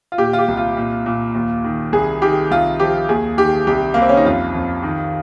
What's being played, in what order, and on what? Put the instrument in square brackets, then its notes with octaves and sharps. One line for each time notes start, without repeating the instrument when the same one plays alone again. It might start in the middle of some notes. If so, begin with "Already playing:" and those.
[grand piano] F4
A#2 G4
F4
G4
C2
F4
A#2
A#2
D#2
D#3
C2 G#4
D#3 G4
C2 F4
F3 G4
D#2 G#4
D#3 G4
C2 G4
C2 A#3
C4
C#4
D#4
F2 F4
F2
D#3